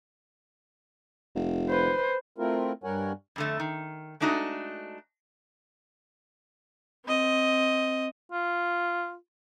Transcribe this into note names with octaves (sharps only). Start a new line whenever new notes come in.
F1
B4 C5
A3 C4 E4 F4 A#4
G2 G3 A#4 C#5 F#5 G#5
F2 D3 A3
D#3
G#3 A3 D4 D#4 F4 F#4
C4 D#5
F4